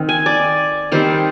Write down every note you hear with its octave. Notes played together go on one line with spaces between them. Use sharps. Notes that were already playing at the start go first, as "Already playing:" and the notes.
Already playing: D#3 C4
G#5
D5
D#3 G3 C4 C5